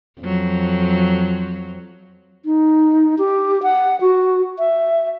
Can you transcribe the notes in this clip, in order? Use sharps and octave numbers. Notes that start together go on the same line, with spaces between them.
F2 F#3
D#4
G4
F#5
F#4
E5